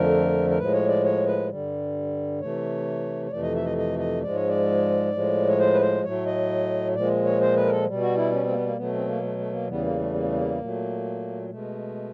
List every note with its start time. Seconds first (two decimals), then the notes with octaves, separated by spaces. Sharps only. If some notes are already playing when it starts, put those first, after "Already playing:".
Already playing: F2 D3 F3 A3 A#4
0.50 A#4
0.58 A2 F3 G#3 B4
0.74 C#5
0.88 D5
1.04 C#5
1.27 B4
1.49 G2 D3 G3
2.40 C3 E3 A3 C#5
3.26 C#5
3.31 F2 C3 E3 A3 D5
3.43 D#5
3.55 E5
3.65 D#5
3.77 D#5
3.99 D#5
4.23 G#2 F3 G#3 D5
4.36 C#5
4.49 D5
5.13 A2 F3 G#3
5.48 C#5
5.59 C5
5.74 B4
5.81 C5
6.04 A2 F#3 A3 C#5
6.26 D#5
6.95 A#2 F3 G#3 D5
7.25 C#5
7.41 C5
7.56 B4
7.66 A#4
7.71 A4
7.86 B2 G3
8.01 F#4
8.16 E4
8.32 C#4
8.44 C4
8.50 A#3
8.54 B3
8.66 A#3
8.77 B2 F#3 A3 B3
8.93 C4
9.07 A#3
9.22 A3
9.38 A3
9.53 A#3
9.67 E2 C#3 E3 G3 B3
9.83 A#3
9.99 A3
10.13 A#3
10.24 A3
10.34 A#3
10.59 A#2 F#3 A3
11.49 B2 G#3 A3